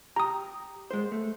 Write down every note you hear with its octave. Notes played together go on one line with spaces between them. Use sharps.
G4 A#5 D#6
G#3 C5
A3